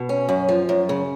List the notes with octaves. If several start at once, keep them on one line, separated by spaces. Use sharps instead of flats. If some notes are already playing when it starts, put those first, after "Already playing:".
Already playing: B2
C#4
F#2
F3
F#2
C#3